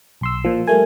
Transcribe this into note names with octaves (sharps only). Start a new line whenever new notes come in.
B1 C6 E6
A#2 F3
G3 A3 A#4 G#5